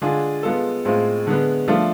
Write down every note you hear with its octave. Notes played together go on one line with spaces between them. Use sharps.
D3 G#3 D4 F4 G#4
G#3 B3 F4 A4
A2 G#3 C4 F4
D3 G#3 B3
F3 A3 D4 F4